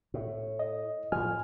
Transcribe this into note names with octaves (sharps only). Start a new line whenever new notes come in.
A2
D#5
A2 F3 G#5 F6